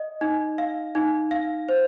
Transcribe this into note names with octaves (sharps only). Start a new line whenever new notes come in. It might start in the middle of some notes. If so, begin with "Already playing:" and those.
Already playing: D#5
D#4
F5
D#4
F5
C5